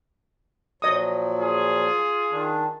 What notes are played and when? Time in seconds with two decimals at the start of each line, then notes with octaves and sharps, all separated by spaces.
0.82 A#2 F3 F#3 D#5 D#6
1.40 F4 G#4
2.30 D#3 D4